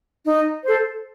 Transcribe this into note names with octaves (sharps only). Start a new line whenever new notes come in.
D#4
A4 C5